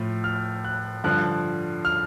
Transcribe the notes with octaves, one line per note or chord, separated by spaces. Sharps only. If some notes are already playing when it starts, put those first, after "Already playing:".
Already playing: A2 F3
F6
F#6
G2 D3 F3 F#6
F6